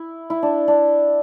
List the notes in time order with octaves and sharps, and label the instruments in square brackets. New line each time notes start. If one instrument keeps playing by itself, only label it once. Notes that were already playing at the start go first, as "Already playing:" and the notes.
Already playing: [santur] E4
E4
D4
D4